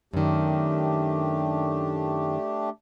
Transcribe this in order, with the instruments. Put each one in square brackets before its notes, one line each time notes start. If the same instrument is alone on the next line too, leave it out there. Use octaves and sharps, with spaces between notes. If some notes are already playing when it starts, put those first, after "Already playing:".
[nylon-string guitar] F#2 D#3 [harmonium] A3 D4 G4